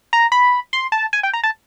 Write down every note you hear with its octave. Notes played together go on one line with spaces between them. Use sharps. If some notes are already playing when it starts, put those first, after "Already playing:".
A#5
B5
C6
A5
G#5
G5
A#5
A5